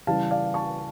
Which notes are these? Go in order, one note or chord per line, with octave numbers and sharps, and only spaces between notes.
C#3 E3 G3 F5 A5
D5 F5
A5 C#6